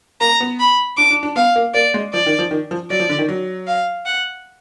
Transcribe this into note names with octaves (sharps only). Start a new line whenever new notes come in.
A#3 A#5
B3
B5
D4 D6
D4
D4
B3 F5
A#3
A#3 D5
G#3
F3 D5
D#3
F3
D#3
F3
F#3 D5
F3
D3
D#3
F#3
F5
F#5